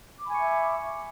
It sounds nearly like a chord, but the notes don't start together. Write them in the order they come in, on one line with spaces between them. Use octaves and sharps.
D6 B5 G#5 C#6 E5